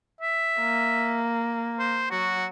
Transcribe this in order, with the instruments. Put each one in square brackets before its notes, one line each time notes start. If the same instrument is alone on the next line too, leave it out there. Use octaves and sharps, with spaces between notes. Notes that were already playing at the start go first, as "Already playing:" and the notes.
[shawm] E5
[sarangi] A#3
[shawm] C5
[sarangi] F#3 [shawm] F#4